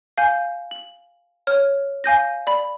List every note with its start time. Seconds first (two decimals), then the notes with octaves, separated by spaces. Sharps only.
0.18 F5 G#5 G6
0.71 F#7
1.47 C#5 F6
2.04 F5 G#5 G6 A#6
2.47 D5 B5